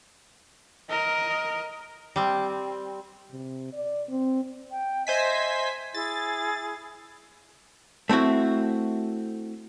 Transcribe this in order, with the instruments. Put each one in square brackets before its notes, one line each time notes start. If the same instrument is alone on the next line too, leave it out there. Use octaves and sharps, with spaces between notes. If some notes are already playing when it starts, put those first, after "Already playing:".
[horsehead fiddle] A#4 D#5
[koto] G3 C4
[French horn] C3
D5
C4
[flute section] G5
[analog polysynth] C5 G#5 B6 [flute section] D#5 E5
[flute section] E4 G#4 [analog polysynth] A6
[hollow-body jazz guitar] A3 C4 E4 F#4